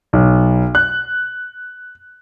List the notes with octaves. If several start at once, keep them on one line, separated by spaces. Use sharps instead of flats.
B1
F#6